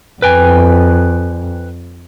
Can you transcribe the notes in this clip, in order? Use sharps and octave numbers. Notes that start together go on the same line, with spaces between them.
F2 B4 G5 G#5